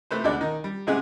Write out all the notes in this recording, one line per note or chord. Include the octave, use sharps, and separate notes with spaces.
C3 A3 B4 C5
D2 B2 D3 G#3 D5
D#3 D#4
G3
A1 C3 G#3 G#4 F#5